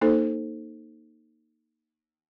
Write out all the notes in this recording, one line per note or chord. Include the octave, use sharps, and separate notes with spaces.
A#3 D#4 A4 C5